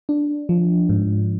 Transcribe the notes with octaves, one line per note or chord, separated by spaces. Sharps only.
D4
F3
G#2